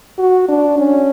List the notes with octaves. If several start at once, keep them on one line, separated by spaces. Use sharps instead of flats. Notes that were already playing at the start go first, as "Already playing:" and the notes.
F#4
D4
C#4